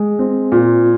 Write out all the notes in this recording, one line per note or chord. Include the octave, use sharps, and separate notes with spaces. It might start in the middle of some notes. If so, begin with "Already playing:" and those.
Already playing: G#3
C4
A#2